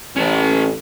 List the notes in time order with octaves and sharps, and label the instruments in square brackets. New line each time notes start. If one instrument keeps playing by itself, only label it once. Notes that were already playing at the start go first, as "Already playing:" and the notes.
[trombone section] A1 [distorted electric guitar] C#4 A5